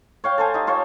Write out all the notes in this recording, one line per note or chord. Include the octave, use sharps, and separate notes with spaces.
C#5 F5 G5
A4 C5 G#5
D#4 G4
F4 C5 C#5